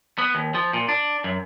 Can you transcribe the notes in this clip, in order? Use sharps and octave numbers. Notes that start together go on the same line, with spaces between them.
B3
D#2
F3
A#2
D4
F#2